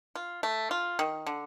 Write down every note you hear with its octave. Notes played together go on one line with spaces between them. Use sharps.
F4
A3
F4
D#3
D3